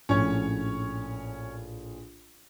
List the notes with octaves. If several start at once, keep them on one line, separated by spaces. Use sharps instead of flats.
A#1 A2 C#4 C#5